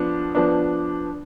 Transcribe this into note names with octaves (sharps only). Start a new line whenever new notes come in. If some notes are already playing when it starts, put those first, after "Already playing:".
Already playing: F3 B3 D4
F3 B3 D4